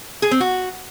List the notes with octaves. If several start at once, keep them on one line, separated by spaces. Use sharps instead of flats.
G#4
C4
F#4